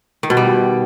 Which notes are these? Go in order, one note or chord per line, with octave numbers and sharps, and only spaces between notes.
D#3
B2
G3